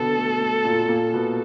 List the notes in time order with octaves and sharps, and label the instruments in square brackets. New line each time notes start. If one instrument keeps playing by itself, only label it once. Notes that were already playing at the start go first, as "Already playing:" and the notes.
Already playing: [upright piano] B2 D3 B3 [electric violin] A4
[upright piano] A3
A3
A#2 A#3
A#2 A#3
B2 B3